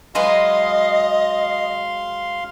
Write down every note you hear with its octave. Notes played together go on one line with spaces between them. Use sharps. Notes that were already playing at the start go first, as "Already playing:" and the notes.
F#3 G#3 B4 D#5 F5 C6